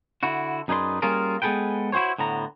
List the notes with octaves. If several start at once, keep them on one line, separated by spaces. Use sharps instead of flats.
D3 E4 F#4
F#2 D#4 G#4 B4 D5 C6
G3 A#3 C#4 F4 G#4 A#4
G#3 B3 G#4 A4 B4 G5
E4 F#4 G4 C5 C#5
A2 D3 B3 A#5